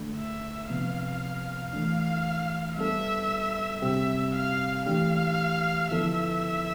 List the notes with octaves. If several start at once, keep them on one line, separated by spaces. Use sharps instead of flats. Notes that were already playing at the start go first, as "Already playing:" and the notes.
Already playing: D3 A3 D4
E5
C3 F3 B3 F5
E3 A3 D4 F5
G3 B3 D4 A4 E5
C3 G3 C4 G4 E5
F5
E3 A3 D4 G4 F5
D3 F3 B3 E4 A4 E5